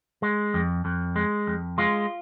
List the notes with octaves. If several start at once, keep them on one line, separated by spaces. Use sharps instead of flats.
G#3
F2
F2
G#3
F2
G#3 F4